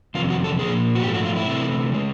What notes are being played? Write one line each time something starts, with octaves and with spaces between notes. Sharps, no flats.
F2 C3 D#3 F4
F#4
A4
A#2 F3 A#3 G#4
F#4
G#2 F3 A3 G4
F#4
F4
E4
C3 E3 A3
C#3 G#3